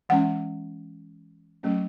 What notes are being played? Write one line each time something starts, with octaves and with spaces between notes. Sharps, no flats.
E3 G#3 C#4 F#5
F#3 A3 C#4